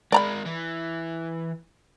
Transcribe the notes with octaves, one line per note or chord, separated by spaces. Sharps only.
G#3 A#4 D5 A#5 B5
E3